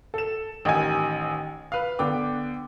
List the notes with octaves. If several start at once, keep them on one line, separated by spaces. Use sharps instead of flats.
A4 E7
A1 D#3 D#5 G#5
B4 F5
D3 B3 G5 D6